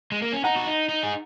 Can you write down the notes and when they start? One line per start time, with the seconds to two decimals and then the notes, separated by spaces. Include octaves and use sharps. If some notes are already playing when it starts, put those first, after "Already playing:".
0.12 G#3
0.22 A#3
0.33 C#4
0.44 D#4 F#5 A#5
0.56 F#4
0.67 D#4
0.89 D#4
1.03 G#4